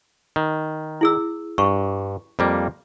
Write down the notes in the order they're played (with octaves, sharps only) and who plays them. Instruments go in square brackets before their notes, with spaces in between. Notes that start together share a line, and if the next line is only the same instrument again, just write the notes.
[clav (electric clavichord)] D#3
[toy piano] E4 G#4 E6
[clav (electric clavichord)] G2 [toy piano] C#6
[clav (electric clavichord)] F2 G3 A#3